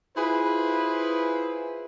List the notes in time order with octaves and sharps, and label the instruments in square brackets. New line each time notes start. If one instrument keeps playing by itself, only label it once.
[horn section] E4 F4 G#4 B4 C5